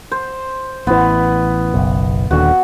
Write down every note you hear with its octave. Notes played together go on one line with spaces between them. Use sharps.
C5
A1 E3 B3
F#1 B1
D#1 D#2 D3 F#4